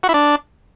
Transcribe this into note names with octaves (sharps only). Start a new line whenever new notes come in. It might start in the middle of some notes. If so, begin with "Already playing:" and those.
F#4
E4
D4